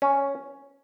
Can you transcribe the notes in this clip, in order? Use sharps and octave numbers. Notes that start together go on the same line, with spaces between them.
C#4